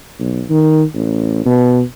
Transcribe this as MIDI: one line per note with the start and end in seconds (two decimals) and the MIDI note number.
0.20 0.43 35
0.49 0.83 51
0.94 1.42 33
1.45 1.81 47